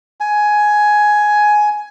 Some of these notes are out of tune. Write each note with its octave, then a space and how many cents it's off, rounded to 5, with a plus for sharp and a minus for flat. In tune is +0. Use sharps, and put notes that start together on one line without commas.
G#5 +10